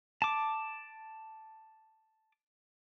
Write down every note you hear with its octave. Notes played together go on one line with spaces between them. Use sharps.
A5 D6